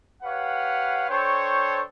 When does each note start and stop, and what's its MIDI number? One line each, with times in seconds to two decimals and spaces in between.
0.22 1.04 67
0.22 1.04 71
0.22 1.04 73
0.22 1.04 77
0.22 1.04 78
1.09 1.80 62
1.09 1.80 69
1.09 1.80 72
1.09 1.80 73
1.09 1.80 79
1.09 1.80 85